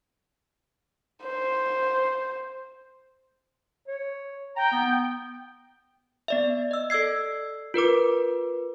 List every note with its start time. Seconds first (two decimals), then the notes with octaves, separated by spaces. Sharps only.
1.23 C5
3.88 C#5
4.57 G5 A#5
4.72 B3
6.28 B3 D5 E5
6.71 D#5 E6
6.90 A4 D5 E6 G#6 C7
7.74 F4 A#4 B4 D6